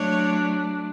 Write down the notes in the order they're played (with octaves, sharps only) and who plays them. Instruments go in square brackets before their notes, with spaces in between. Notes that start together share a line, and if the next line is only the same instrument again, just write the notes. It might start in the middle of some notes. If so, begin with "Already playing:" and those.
Already playing: [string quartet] F#3 A3 D4 C#5